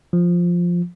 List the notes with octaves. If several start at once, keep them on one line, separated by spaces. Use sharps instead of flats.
F3